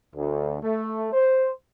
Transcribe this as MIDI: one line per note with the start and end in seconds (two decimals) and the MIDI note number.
0.15 0.59 38
0.62 1.10 57
1.13 1.49 72